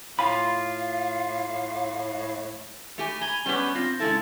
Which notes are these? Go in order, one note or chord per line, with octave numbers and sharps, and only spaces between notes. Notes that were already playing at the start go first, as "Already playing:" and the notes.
A2 F4 F5 G#5 B5
A3 G4 G#5
G#5 A#5 G7
G3 B3 C#4 G4
C4 F4 A#6
C#3 G#3 E4 A4 A6